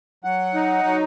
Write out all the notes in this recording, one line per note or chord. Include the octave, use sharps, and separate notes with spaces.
F#3 F#5
D#4
F#3